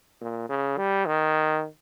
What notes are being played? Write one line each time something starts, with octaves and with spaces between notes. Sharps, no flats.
A#2
C#3
G3
D#3